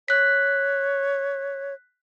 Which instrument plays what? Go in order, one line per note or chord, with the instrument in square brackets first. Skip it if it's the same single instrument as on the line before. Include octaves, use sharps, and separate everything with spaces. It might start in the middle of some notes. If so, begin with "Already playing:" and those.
[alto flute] C#5 [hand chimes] F#6 B6